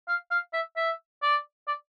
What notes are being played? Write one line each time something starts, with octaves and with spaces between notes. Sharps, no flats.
F5
F5
E5
E5
D5
D5